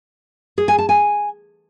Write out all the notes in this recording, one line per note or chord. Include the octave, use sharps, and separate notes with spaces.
G#4
G#5
A5
G#5